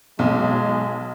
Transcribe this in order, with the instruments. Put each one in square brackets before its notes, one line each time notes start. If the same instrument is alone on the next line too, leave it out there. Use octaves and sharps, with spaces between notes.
[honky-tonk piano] B1 [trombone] G#3